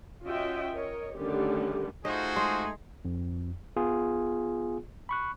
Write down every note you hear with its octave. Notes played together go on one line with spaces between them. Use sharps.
C#4 F4 F#4 D#5 E5 G5
A#4 C#5 D#5
D3 D#3 G3 A3 C#4 G4
A3 D#4 F4 F#4 G#4 C5 D#5
G#3 C6
F2
B3 F4 G#4
B5 C#6 F#6